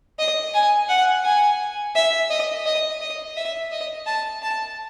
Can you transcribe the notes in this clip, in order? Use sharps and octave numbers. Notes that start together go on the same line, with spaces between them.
D#5
G#5
F#5
G#5
E5
D#5
D#5
D#5
E5
D#5
A5
A5